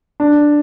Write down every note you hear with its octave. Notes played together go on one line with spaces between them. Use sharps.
D4